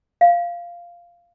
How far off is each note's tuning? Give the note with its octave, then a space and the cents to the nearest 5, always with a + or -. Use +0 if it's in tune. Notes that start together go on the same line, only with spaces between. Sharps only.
F5 -10